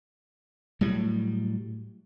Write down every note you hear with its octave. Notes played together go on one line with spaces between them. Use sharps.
A2 F#3 G3